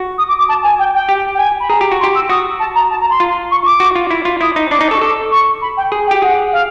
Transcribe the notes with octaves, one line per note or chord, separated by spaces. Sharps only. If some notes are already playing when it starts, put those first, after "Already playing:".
Already playing: F#4
D#6
D6
D6
A5
G#5
G5
G5
G4
G5
G#5
B5
G#4 A#5
G4
F#4
C6
G4
E6
F#4 D#6
A5
A#5
A5
A#5
C6
F4
C#6
D6
F#4
F4
E4
F4
E4 D#6
D#4
D4 D6
D#4
A4 C#6
A4 D6
C#6
B5
G5
G#4
G5
G4
G#4 F#5
F5